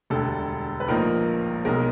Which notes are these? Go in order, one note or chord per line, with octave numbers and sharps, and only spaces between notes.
E1 D2 D3 G3 A4
B4
A#1 A2 F3 A#3 D#4 A#4
B1 B2 G#3 A#4